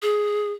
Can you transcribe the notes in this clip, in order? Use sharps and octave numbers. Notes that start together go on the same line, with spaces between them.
G#4